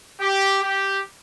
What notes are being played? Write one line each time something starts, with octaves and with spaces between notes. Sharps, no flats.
G4
G4